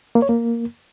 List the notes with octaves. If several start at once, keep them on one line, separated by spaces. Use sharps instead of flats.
A#3
C#5
A#3